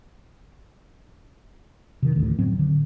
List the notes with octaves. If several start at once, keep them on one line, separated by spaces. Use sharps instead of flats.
C3 D#3
A1 D2
A2 F#3 C4
D3